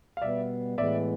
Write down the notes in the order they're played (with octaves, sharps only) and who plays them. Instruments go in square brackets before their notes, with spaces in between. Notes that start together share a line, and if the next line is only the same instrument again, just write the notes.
[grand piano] F5
[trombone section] B2 G3 B3 [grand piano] D5 E5
[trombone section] A2 E3 G#3 B3 [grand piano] D5 E5